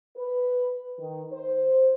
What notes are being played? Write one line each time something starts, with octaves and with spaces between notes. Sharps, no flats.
B4
D#3
C5